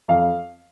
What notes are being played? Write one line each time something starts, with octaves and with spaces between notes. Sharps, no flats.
F2 F5